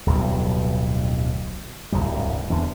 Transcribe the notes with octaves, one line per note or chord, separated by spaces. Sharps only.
D1 B1 F2 G3
D1 C2 G#2 G3
E2 D3